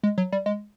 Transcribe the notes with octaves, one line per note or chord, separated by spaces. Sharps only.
G#3
F#3
G3
G#3